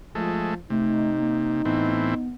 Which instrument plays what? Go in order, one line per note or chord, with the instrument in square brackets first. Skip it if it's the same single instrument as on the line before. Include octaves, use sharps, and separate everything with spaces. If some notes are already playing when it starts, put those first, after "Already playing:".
[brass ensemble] F3 [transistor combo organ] G#3 A3
[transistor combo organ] C3 [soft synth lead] A3 [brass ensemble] D#4
[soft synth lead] A#3
[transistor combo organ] A2 E3 C4 [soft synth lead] B3